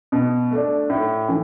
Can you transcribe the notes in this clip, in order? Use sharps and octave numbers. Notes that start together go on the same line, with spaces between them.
B2
A3 D4
A2
E3